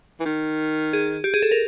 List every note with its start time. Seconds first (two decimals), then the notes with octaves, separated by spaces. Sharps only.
0.20 E3
0.26 D#3
0.93 G#4
1.24 G4
1.34 G#4
1.42 A4
1.51 A#4